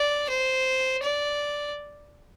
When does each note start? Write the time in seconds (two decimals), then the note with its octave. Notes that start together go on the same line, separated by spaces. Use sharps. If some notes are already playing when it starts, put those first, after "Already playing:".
Already playing: D5
0.29 C5
1.04 D5